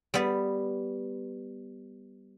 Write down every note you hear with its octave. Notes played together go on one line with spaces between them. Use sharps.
G3 B3